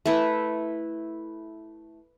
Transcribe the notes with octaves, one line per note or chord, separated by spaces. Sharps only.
A3 E4 B4